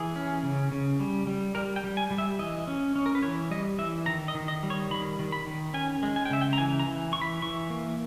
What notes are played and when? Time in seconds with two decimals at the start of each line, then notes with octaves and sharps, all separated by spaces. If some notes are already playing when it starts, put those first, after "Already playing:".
Already playing: E3 G#4
0.16 C#4
0.43 C#3
0.72 C#3
1.00 G3
1.27 G3
1.55 G3 A#4
1.76 G5
1.84 G3
1.97 G#5
2.11 G3
2.18 E5
2.39 E3 D#5
2.67 C#4
2.96 C#4
3.06 A#4
3.15 B4
3.23 E3 C#5
3.50 G3 D#5
3.79 E3 E5
4.06 D#3 A#5
4.28 D#5
4.35 D#3
4.48 D#5
4.63 G3
4.70 C#5
4.90 D#3 B5
5.19 D#3
5.32 B5
5.47 D#3
5.74 C#4 G#5
6.03 G#3
6.16 G#5
6.25 G5
6.30 C#3 E5
6.41 G5
6.53 A#5
6.58 E3 G#5
6.79 A#5
6.86 E3
7.13 E3 C#6
7.22 B5
7.42 E3 C#6
7.70 A#3